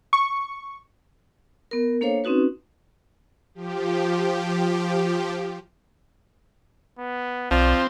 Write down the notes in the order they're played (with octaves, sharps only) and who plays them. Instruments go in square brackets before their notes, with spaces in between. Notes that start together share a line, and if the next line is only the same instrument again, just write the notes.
[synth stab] C#6
[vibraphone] B3 A#4
A#3 D4 A4 C5 C#5 F5
C4 C#4 D#4 F#4 B4
[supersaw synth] F3 G4
[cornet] B3
[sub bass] B1 [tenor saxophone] F3 [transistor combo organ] C4 [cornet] D5